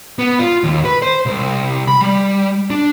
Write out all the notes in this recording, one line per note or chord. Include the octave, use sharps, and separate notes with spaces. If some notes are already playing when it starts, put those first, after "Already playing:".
B3
F4
D#2
B4
C5
C2
B5
G3
D4